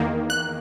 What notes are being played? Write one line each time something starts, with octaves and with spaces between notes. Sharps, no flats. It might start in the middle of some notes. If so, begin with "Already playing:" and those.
Already playing: E2 D#3 A#3
F#6